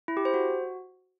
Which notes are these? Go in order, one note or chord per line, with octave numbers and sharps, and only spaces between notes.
E4
G4
C5
F#4